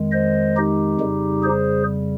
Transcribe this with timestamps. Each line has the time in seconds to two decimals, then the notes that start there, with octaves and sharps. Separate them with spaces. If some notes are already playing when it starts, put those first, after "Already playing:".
Already playing: F2 D#3 G#3
0.12 C5 D#5
0.57 D#4 G4
1.00 F2 C#3 G3
1.43 G#4 C5